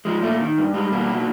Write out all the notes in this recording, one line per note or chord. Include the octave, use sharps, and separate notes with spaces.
F3 G#3
A#2 A3
D#3
G2
G3 G#3
B2 A#3
F#3